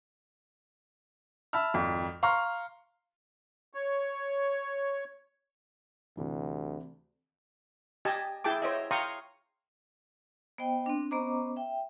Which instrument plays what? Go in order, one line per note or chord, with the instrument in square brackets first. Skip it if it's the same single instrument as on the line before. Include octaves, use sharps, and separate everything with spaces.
[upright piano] E5 A5 B5 E6 F6
G#1 F2
F5 A#5 C6 C#6 F6
[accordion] C#5
[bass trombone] D2 [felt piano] C3 E3
[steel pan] G4 D#5 G#5 A5
E4 G#4 G5 A5 D6
C5 C#5 D#5 E5
F5 G5 A#5 C6 C#6 D#6
[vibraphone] B3 C5 D#5 G5
C4 D4
B3 C#4 C5 D#5 A#5 D6
E5 G5